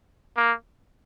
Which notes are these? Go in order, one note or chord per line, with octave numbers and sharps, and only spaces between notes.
A#3